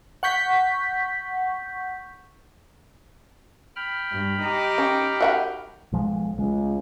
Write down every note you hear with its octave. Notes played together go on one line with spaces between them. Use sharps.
F#5 C#6 G6 B6
G5 B5 F6
G2
D#4 G4
C#4
F#4 E5 F#5
B1 F3 G#3
C#2 G#3